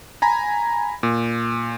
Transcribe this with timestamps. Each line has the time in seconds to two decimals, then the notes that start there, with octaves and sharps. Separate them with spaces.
0.22 G#5 A#5 B5
1.03 A#2